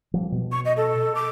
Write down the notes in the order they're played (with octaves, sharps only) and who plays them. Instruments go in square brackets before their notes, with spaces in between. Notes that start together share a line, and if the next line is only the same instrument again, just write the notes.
[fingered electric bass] F3 G3
B2
[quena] C#6
D#5
A4
D6